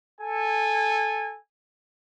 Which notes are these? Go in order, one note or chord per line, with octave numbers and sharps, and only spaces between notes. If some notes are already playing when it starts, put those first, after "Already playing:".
A4 G#5